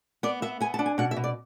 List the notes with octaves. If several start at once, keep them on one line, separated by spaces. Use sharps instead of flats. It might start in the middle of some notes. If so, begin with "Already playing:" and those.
B3 D5
B3 E5
B3 G#5
A5
D4
G#5
B2 F#5
E5
B2
D5